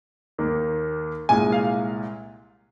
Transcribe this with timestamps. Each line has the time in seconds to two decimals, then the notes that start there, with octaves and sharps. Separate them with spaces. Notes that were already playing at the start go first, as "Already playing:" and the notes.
0.38 D#2 D#3 A#3
1.29 C2 A#2 G#3 G#5
1.52 F5